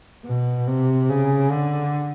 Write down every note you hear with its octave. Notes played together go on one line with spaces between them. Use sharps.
B2
C3
C#3
D3